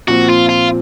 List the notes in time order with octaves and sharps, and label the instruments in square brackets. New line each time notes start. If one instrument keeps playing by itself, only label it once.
[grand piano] A#2 F3 C4 [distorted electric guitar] F#4
[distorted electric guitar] F4
F4